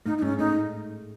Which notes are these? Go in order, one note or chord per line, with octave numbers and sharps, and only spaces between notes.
A2 A3 D#4
D#4
G#2 G#3 C#4
A2 A3 D#4